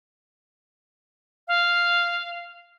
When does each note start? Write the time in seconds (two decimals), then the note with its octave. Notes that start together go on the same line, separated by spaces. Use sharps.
1.48 F5